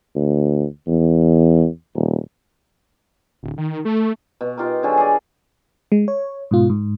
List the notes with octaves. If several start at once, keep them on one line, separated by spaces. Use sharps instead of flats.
D2
E2
D#1
D1
D#3
A3
B2
D#4 F4 G4 A#4
D3 F#3 G#4
G#4 D5
G#3
C#5
G#2 B2 F4
G#2